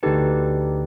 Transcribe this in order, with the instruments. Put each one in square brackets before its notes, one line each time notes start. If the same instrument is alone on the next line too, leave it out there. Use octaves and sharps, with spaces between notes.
[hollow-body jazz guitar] D2 A4 [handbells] D#4 G4 B4